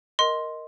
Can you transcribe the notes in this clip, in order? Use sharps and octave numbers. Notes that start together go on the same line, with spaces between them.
A#4 D#5 C6